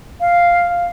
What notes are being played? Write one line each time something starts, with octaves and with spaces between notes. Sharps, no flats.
F5